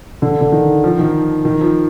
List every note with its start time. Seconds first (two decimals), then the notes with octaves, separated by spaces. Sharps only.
0.22 D3
0.41 D3
0.52 D#3
0.84 F3
0.99 D#3
1.45 D#3
1.61 F3